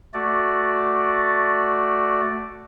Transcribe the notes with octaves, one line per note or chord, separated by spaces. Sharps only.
A3 F#4 D5